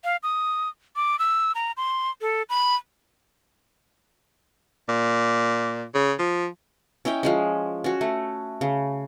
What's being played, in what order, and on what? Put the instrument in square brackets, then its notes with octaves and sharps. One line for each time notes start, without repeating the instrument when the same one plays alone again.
[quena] F5
D#6
D6
E6
A#5
C6
A4
B5
[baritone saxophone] A#2
C#3
F3
[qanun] C#4 E4 D#5 G5
F3 G#3 C#4
C#4 F#4
A3
C#3